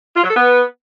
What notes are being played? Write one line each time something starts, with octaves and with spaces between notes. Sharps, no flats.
F4
F#3
A4
B3